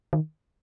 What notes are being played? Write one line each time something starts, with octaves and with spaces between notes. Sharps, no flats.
D#3